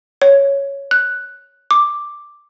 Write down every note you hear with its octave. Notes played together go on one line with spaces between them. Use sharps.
C#5
F#6
D6